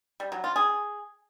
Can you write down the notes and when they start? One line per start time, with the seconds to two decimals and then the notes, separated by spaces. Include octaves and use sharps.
0.20 G3
0.32 F#3
0.44 F4
0.56 G#4